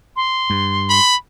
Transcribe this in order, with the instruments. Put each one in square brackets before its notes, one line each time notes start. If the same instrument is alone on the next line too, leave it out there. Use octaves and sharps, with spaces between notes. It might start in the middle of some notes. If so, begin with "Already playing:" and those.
[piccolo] C6
[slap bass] G2
[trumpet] B5